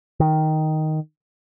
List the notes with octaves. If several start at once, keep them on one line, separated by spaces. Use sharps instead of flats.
D#3